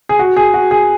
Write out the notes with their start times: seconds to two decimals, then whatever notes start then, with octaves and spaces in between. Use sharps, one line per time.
0.09 G#4
0.19 F#4
0.36 G#4
0.54 F#4
0.71 G#4